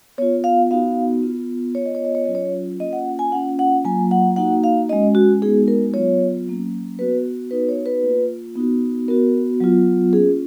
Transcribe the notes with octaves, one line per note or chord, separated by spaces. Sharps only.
B3 F4 C#5
F5
B3 D#4 F#4 F5
B3 F4
B3 F4 C#5
D#5
C#5
D#5
C#5
F#3 C#4 F4 D#5
C#5
A#3 C#4 F4 D#5
F#5
G#5
A#3 C#4 F4 F#5
F#5
F#3 A#3 F4 G#5
F#5
A#3 D#4 F#4 F#5
F5
G#3 C#4 F#4 D#5
F#4
G#3 B3 D#4 F#4 G#4
A#4
F#3 B3 F4 C#5
F#3 A#3 C#4
B3 F#4 B4
B3 D#4 F#4 B4
C#5
B4
A#3 F4
B3 D#4 F#4
B3 F#4 A#4
F#3 B3 F4
A#3 C#4 F4 G#4